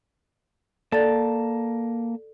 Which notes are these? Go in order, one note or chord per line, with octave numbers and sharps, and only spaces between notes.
A#3 A4 D5 A5 A6